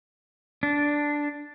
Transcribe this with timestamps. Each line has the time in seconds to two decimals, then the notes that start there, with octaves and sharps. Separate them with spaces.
0.63 D4